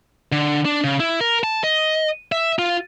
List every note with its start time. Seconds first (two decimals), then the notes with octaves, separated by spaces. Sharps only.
0.32 D3
0.65 D4
0.84 C#3
1.00 E4
1.21 A#4
1.44 A5
1.64 D#5
2.32 E5
2.59 F4